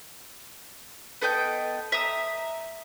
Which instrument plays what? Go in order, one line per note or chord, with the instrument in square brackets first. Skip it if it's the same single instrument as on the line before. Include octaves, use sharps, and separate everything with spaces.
[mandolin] B3 A4 D#5 G5
E5 A#5 D#6